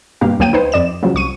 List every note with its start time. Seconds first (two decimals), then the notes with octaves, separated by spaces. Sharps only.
0.21 G2 B2 A#3 G4 F5
0.39 D2 F#3 A#3 G5 D#7
0.53 D#4 B4 C5
0.72 F2 D5 E7
1.03 C#3 F3 F#3
1.14 C2 C#6 D#7